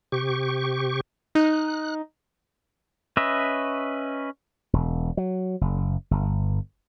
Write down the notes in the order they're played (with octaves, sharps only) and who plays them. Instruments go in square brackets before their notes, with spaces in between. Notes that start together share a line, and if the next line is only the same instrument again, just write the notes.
[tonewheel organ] C3 G4 C#6
[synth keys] D#4 [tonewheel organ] F#6
[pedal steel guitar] C#4 B4 D#5 E5
[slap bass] E1
F#3
F#1
G1